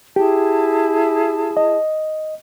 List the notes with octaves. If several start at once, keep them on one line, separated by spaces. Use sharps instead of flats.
E4 G4 G#4 A5
D#5